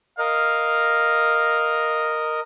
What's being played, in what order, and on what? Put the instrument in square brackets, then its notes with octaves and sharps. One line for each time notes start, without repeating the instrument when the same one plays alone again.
[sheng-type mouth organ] A#4 D#5 [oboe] F5